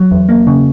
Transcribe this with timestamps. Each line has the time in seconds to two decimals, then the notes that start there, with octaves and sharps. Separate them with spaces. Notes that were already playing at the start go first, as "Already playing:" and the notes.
Already playing: F#3
0.11 E2
0.29 A#3
0.47 C#3